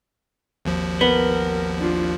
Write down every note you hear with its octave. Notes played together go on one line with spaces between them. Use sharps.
G#1 D#2 F3
B3 A#4
D4 F4